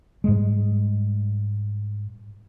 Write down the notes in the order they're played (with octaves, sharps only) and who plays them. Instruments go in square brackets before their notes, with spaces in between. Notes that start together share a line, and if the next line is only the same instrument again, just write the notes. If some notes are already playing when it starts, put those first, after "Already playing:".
[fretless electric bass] G#2 G3 G#3